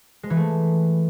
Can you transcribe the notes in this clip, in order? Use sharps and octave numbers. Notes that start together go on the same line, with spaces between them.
G#3
E3
A3